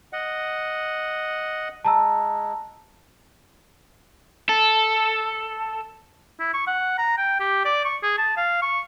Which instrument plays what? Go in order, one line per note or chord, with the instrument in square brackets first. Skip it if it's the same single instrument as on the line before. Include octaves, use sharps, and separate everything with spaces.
[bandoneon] D#5 F#5
[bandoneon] G#3 [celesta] A5 A#5 E6
[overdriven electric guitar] A4
[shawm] E4
C#6
F#5
A#5
G5
G4
D5
C#6
G#4
A5
F5
C#6